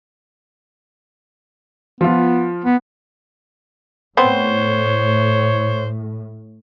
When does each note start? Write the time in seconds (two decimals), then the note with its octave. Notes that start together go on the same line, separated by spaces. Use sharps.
2.01 F3 B3 F4
2.65 B3
4.17 A2 B3 C4 C5 C#5